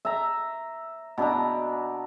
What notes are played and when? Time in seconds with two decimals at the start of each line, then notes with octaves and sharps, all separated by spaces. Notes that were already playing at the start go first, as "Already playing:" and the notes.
0.05 E5 A#5
1.18 B2 D4 E5 A#5